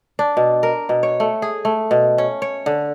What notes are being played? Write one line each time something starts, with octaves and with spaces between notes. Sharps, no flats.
D4
B2
A#4
B2
C#5
A3
G#4
A3
B2
C#4
C#5
D3